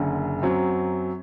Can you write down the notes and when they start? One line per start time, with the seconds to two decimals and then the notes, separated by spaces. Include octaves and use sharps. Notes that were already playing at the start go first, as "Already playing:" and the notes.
Already playing: F#1 F#2 D3
0.42 F#2 F#3 C4